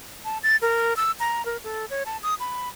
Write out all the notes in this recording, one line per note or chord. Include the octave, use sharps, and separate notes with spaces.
A5
A6
A#4
E6
A#5
A#4
A4
C#5
A5
D#6
B5